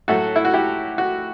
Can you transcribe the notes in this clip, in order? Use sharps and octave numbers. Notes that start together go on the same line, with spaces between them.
A2 F#3 A3 F#4 A4
E4
F#4
E4 G4
F#4